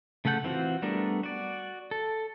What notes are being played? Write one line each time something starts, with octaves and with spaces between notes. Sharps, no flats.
C#3 A3 A4 F#5 G6
E3 C4 F4 F#4
G3 A3 B3 D4 A#4
F#4 D5
A4